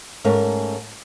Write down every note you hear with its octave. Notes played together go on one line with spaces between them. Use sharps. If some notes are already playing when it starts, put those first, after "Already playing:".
G#2 A3 C#4 A#4